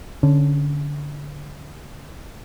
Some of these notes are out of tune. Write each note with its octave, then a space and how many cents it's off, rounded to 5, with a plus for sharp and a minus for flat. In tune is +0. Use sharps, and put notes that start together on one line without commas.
D3 -15 C#4 +0